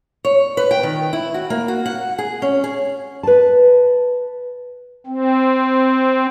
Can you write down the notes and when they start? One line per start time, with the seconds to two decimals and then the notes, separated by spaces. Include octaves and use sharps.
0.25 C#5
0.57 B4
0.71 G5
0.83 D#3
1.13 E4
1.34 F#4
1.50 A#3
1.68 F#4
1.86 F#5
2.18 G#4
2.42 C#4
2.64 G#4
3.23 B4 A5
5.07 C4